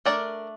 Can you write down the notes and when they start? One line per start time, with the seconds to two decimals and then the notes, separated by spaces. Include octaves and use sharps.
0.05 A3 D4 A#4 D5